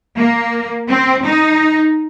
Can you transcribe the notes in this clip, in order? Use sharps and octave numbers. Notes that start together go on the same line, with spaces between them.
A#3
C4
D#4